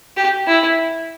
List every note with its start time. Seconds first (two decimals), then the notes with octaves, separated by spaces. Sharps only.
0.17 G4
0.47 E4